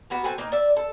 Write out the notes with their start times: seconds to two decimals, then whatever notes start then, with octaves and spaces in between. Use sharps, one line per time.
0.10 A#3 B3 F#4
0.24 C4 F#4 A4 G#5
0.38 A#3 D#4
0.52 D5 E5
0.77 A4